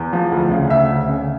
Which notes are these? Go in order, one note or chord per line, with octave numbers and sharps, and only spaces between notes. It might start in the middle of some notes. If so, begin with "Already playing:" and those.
Already playing: E2
F3
D2
C#3
D2 E5
D2
C#3